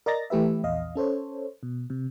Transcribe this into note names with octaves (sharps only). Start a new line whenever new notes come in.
A#4 D5 D#5 A#5 A6 A#6
E3 A3 G4 B4 E5
A#1 E2 D#5 F5
C#4 A4 C5 C#5
B2
C3